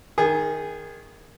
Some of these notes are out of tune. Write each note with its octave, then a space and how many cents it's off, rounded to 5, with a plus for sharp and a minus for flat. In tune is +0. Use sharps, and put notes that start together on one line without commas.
D#3 +0 G#4 -15